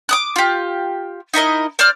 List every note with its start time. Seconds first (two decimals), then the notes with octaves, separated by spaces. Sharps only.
0.09 D6 D#6 F#6
0.36 F4 G4
1.34 D#4 E4 A#4 D#5
1.79 C5 D5 F6